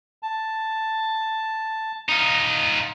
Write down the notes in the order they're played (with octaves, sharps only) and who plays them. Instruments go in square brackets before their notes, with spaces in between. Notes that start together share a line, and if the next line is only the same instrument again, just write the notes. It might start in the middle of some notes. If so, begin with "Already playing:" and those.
[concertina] A5
[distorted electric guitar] D#4 F4